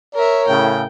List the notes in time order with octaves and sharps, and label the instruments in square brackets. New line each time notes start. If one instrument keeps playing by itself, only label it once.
[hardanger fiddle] A#4 E5 [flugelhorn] C#5
[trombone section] A2 C#3 [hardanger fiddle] G5